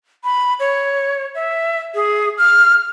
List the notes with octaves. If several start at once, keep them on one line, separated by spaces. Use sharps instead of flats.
B5
C#5
E5
G#4
F6